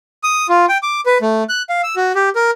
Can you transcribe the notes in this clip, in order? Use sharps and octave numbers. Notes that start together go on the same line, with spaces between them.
D#6
F4
G5
D6
B4
A3
F#6
F5
E6
F#4
G4
A#4